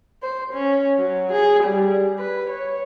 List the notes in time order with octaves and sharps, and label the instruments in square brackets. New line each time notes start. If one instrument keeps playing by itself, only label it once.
[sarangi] C5
C#4
F#3
G#4
G3
B4
C#5